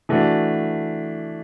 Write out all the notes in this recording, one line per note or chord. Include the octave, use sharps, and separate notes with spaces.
E3 A3 D4 F#4